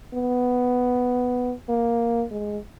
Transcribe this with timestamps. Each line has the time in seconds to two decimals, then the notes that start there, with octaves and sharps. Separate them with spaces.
0.14 B3
1.69 A#3
2.31 G#3